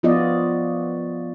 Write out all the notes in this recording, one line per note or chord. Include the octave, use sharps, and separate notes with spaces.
F3 B3 F4 F#4 D5 D#5